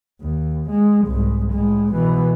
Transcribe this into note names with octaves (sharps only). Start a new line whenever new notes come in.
D#2
G#3
C2 G#2
A2 G#3
B2 E3